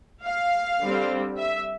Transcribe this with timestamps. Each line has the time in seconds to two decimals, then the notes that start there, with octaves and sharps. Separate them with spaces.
0.24 F5
0.81 D3 G3 C4
1.37 E5